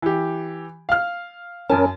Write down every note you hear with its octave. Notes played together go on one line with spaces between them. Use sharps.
E3 G4
F5 F6
F#2 C#4 A#4 G#5 A5